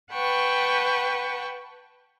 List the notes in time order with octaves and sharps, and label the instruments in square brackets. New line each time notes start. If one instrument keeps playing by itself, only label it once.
[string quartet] B4 F#5 G5 A5 C#6